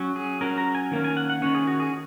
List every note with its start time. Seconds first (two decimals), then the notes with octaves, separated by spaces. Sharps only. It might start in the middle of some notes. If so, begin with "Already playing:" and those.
Already playing: F#3 C#4
0.16 G#4
0.41 F#3 C#4 A#4
0.58 A#5
0.75 G#5
0.91 D#3 A#3 C#4
1.04 G#5
1.17 F#5
1.30 F#5
1.42 D#3 A#3 C#4 C#5
1.54 G#4
1.67 F#4
1.80 G#4